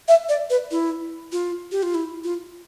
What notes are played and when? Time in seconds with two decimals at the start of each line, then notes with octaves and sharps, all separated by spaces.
0.08 E5
0.29 D5
0.50 B4
0.71 E4
1.32 F4
1.72 G4
1.83 F4
1.94 E4
2.24 F4